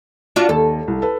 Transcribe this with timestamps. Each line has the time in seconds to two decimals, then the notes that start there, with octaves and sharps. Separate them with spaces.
0.36 D4 F4 F#4
0.49 D#2 A4
0.88 C2
1.02 A4 B4